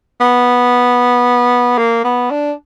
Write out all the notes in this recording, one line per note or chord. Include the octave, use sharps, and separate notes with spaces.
B3
A#3
B3
D4